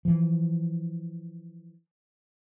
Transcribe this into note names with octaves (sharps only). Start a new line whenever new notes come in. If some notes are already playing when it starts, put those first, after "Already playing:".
E3 F3